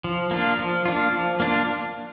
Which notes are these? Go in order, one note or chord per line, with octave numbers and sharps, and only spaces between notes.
F3
A#3 D4 F4
F3
A#3 D4 F4
F3
A#3 D4 F4